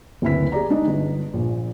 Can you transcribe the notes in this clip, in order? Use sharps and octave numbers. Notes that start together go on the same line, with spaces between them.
F#1 D2 C4 E4 B4 B6
G4 G#4 D5 A#5
G#3 D4 D#4 D#5
G1
A#1 A#2